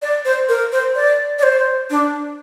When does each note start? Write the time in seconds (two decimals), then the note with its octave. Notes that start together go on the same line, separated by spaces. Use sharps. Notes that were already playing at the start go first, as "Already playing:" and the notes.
0.02 D5
0.25 C5
0.49 A#4
0.72 C5
0.96 D5
1.39 D5
1.43 C5
1.90 D4